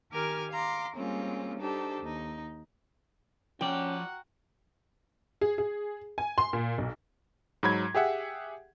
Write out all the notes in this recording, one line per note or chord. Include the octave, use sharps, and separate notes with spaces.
D#3 G4 A#4 G#5 D6 F6
F5 A#5 C6 D6
G3 G#3 A#3 C4 C#4 F4
D4 D#4 G4 A4 C5
D#2 D#4
F3 C#4 F#4 A#4 D5 F#5 G5
G#4
G#4
G#5
C6
A#2
B1
G#2 F#3 B5 G#6
G4 G#4 E5 F#5